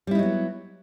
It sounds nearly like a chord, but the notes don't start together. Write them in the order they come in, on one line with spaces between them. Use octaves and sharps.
G3 E4 D#4 F#3 B3